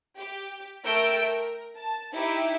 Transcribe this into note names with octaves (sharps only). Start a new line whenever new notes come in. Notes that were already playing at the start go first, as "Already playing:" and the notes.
G4
A3 A#4 G5 E6 G6 D7
A#4
A5
D#4 E4 G4 E5